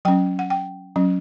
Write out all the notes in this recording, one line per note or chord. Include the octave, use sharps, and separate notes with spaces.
F#3 C#4 G5
F#5
G5
F#3 C#4